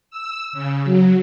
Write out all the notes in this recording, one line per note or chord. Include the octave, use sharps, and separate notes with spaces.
E6
C#3
F#3